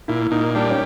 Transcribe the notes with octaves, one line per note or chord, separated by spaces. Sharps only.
A#2 E4
A#2 D#4
G3 D4
C#4